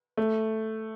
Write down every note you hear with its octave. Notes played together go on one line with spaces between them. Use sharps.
A3